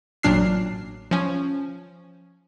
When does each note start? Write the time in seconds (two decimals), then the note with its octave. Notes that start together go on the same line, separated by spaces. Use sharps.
0.23 A1 A#2 F#3 D4 F6 C7
1.11 F3 C#4